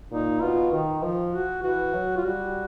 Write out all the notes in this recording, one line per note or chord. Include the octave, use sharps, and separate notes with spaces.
A#2 D#4
B2 F4
D#3
F3
F#4
E3 F#4
F#3
F4
G3 F#4